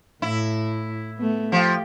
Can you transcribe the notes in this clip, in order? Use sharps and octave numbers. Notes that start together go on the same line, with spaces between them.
A2 E4
A3 B3
F3 G4